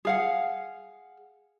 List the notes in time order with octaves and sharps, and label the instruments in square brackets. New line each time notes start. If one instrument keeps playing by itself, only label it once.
[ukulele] G#4 F5 F#5